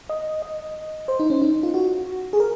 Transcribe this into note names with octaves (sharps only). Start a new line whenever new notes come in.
D#5
D#5
C5
D#4
C#4
D#4
F4
F#4
G#4
A#4